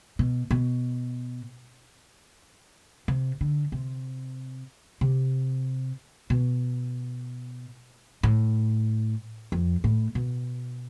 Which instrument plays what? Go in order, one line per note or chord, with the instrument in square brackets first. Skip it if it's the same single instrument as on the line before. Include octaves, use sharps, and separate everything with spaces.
[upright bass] B2
B2
C3
D3
C3
C3
B2
A2
F2
A2
B2